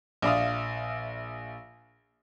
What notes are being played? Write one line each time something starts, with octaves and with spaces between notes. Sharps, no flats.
A#1 D5 E5 F5 D#6